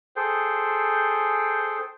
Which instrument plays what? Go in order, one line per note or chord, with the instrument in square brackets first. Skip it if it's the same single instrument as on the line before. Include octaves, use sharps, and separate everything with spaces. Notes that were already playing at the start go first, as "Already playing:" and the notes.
[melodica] G#4 A4 C5 G5